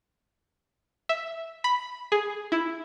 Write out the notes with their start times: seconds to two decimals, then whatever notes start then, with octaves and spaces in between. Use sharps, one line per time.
1.09 E5
1.64 B5
2.12 G#4
2.52 E4